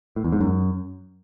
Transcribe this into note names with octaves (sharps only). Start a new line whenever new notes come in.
A2
E2
G#2
F#2